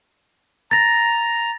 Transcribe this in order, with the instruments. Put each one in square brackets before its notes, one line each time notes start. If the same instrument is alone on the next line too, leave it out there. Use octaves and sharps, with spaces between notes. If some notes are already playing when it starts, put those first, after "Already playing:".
[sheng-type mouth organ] A#5 [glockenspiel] A6 A#6